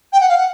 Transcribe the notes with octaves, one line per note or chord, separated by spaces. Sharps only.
G5
F#5
F5
F#5